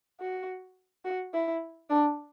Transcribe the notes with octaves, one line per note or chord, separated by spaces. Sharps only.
F#4
F#4
E4
D4